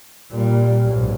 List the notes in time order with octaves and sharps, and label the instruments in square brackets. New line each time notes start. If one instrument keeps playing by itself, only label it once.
[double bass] A#2 G3
B1 G#2